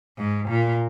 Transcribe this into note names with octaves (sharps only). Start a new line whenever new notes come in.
G#2
A#2